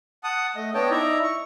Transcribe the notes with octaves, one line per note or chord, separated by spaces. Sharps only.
F#5 A5 D#6
A3 D#5
B3 D4 C#5 D#5 G5 A5
D#4 E4 D5 E5 A#5
C#6